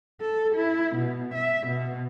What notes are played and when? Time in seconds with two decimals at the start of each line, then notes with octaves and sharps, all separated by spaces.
0.21 A4
0.55 E4
0.95 B2
1.34 E5
1.66 B2